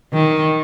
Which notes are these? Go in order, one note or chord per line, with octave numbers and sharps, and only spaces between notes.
D#3